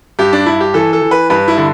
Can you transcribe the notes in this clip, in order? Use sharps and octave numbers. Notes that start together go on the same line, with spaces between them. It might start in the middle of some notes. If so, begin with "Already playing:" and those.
G2 G4
D4
G2 E4
G4
E3 A4
A4
E3
B4
G2 B4
E4
D3